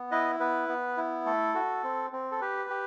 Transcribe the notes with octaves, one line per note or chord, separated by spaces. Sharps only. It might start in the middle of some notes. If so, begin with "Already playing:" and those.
Already playing: B3
E4 B4 D#5
B3 B4
B3
E4
A3 A4
F#4
C4
C4
A4
G4 B4
G4